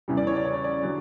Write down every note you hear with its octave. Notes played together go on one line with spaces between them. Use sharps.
E2 C#3 E3 G3
D5
C#5
D5
C#5
D5
D3 F#3